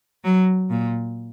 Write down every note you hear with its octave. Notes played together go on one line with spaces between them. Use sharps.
F#3
A#2